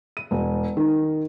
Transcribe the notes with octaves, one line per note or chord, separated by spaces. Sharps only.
D#7
E1
D#3